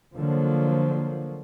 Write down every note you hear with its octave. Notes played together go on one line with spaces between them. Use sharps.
D3 F3 F#3 A#3